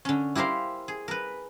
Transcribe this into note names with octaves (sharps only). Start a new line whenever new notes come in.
D3 C#4
E4 G4 A#4 C5 F5
G#4
A#4 B4